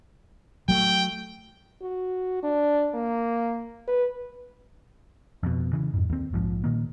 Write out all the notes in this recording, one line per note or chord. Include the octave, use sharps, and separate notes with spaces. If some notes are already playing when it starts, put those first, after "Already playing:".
F#3 A3 G5
F#4
D4
A#3
B4
F2 B2
C#3 E3
F2 G#2
D#2 C4
A#1 G#2 F3
A#2 D#3 A#3